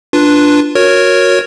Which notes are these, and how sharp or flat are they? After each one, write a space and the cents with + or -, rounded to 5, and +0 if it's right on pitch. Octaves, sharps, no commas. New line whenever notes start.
D4 +0 F4 +0 B4 -5
F#4 -20 A#4 +0 C#5 +0